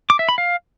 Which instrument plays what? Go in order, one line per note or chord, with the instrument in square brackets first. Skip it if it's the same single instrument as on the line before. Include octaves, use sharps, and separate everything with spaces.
[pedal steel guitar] D6
E5
B5
F5